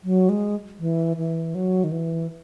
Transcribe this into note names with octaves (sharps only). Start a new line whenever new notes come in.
F#3
G#3
E3
E3
F#3
D#3
E3